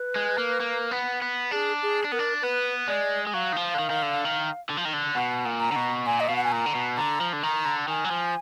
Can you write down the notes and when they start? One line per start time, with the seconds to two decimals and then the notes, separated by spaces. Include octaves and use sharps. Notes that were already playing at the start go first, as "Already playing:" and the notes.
Already playing: B4
0.16 G#3
0.38 A#3
0.60 A#3
0.91 B3
1.22 B3
1.51 D4 G#4
1.83 G#4
2.04 D4
2.12 B3 A#4
2.19 D4
2.42 B3 B4
2.88 G#3 D5
3.27 G#3
3.34 F#3 F5
3.53 D#3
3.56 F3
3.74 D3
3.79 D#3
3.90 D#3
4.02 D3
4.25 D#3
4.70 D3
4.77 F3
4.85 D#3
4.93 D3
5.15 B2 F#5
5.45 A#2
5.60 A#5
5.72 D3
5.76 B2
6.06 A#2 G#5
6.20 D#5
6.28 B2 F5
6.36 F#5
6.44 G#5
6.52 A#2 A#5
6.66 D3
6.75 B2
6.97 D3 A#5
7.21 F3
7.33 D3
7.43 D#3 A#5
7.65 D3
7.88 D#3 G#5
8.04 F#3
8.11 F3